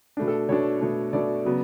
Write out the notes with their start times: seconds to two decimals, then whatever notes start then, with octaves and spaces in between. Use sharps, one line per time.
0.17 B2 A3 D4
0.28 A4
0.49 B2 A3 D4 C#5
0.81 B2 A3 D4
1.13 B2 A3 D4 D5
1.45 C#3 F#3 B3